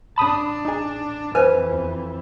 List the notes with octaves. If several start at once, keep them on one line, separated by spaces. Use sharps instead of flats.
A1 D4 A5 B5 D#6
D#4 G#4
F2 E3 B4 C5 G#5
E2